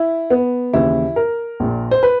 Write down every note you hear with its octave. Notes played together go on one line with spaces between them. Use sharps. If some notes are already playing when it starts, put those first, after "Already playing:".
Already playing: E4
B3
D#2 C#3 E3 E4
A#4
A#1 A#2
C5
B4